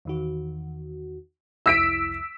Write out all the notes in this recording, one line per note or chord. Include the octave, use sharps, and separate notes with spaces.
E2 D#3 F#4
C2 F2 E4 E6 B6 D7